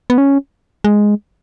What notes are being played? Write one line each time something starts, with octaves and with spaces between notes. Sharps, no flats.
B3
C#4
G#3